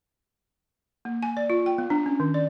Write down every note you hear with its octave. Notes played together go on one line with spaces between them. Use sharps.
A#3
G#5
D5
F4
G5
B3
D4
C#4
D#3
D5